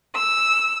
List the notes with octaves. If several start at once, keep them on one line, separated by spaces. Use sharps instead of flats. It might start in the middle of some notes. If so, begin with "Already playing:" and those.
E6